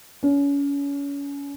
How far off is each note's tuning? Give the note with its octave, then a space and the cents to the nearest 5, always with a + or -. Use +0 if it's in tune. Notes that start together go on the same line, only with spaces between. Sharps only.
C#4 +30